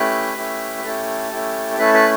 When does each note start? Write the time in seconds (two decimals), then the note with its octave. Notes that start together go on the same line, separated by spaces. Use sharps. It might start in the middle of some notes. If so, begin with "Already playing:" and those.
Already playing: A3 C#4 E4 G4 B4
0.37 A3 C#4 E4 G4
0.84 A3 C#4 E4 G4 A4
1.31 A3 C#4 E4 G4
1.78 A3 C#4 E4 A4 B4
1.94 B4